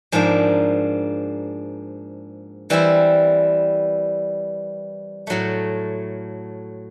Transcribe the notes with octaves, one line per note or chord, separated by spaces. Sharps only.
G#2 F3 A#3 D4
E3 G3 C4 E4
A2 F#3 A3